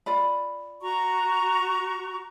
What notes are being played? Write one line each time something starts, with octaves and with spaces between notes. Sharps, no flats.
F4 D5 B5
F#4 A#5 C#6